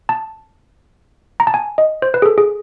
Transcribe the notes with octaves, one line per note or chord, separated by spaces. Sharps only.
A5
A#5
A5
G#5
D#5
C5
B4
G#4
A4
G#4